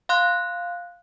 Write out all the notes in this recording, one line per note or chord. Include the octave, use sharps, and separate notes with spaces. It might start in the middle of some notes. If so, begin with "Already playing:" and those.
F5 C6 F#6